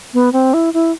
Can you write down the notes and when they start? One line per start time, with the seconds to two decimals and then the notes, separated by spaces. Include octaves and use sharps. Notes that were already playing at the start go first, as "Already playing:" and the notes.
0.14 B3
0.33 C4
0.54 E4
0.74 E4